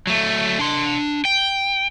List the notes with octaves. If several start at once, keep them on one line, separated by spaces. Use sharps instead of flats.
F#3 A3
D4 C6
G5